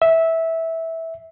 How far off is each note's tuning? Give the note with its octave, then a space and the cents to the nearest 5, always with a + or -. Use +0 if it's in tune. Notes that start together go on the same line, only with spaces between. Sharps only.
E5 -15